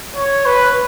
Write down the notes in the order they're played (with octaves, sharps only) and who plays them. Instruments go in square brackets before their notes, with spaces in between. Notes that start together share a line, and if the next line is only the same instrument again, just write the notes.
[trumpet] C#5
B4